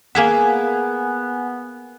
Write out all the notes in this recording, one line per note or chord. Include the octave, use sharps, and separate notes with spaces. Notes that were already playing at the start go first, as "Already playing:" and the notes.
A#3 B3 G#4 E5 F#5 G#5